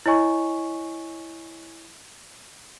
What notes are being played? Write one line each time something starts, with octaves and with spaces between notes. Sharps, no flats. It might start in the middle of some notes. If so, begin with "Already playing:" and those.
E4 C#5 D#5 G#5 C#6